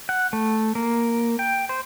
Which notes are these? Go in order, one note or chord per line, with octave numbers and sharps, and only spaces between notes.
F#5
A3
A#3
G5
C5